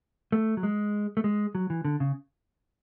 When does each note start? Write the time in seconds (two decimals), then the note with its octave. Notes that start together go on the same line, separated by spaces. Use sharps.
0.32 A3
0.57 F#3
0.63 G#3
1.17 A3
1.24 G#3
1.55 F#3
1.70 E3
1.85 D3
2.00 C#3